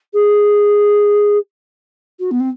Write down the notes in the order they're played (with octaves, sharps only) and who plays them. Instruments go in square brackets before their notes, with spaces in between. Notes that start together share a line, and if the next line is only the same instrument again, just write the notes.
[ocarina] G#4
F#4
B3
C4